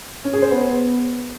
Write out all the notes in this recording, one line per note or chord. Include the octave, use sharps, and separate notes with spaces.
C#4
G#4
C5
B3